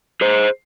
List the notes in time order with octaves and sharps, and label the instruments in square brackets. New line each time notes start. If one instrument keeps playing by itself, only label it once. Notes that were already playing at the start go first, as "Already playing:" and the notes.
[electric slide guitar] G#4 C5